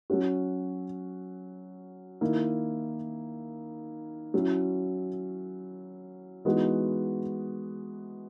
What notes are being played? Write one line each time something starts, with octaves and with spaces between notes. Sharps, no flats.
F#3 C#4 F#4
D#3 A#3 E4
F#3 C#4 E4
E3 G#3 B3 D#4 F#4